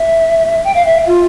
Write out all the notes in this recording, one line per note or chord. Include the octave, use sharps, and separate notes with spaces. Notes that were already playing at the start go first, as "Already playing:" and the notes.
Already playing: E5
G5
F5
E5
F4